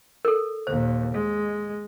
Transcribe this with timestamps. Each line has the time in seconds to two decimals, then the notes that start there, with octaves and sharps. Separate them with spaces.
0.25 A4 A#4
0.67 D#2 A#2 C5
1.14 G#3